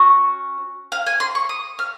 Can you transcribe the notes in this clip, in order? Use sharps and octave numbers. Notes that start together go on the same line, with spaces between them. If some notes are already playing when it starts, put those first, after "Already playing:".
Already playing: C#4 F#4
F5
G#5
C6
C#6
D#6
F6